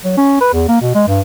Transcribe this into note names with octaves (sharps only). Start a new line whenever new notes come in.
F#3
C#4
B4
E2
A#3
B2
G#3
G2